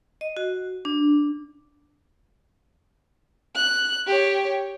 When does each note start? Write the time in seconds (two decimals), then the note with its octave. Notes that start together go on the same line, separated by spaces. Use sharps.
0.21 D#5
0.37 F#4
0.85 D4
3.56 F#6
4.07 G4 C#5